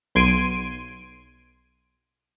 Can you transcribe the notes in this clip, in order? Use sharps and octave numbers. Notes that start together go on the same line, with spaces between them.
B1 C6 G#6 D7 D#7